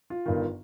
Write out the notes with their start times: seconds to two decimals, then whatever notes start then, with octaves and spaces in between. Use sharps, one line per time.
0.10 F4
0.26 G1 G2 D#3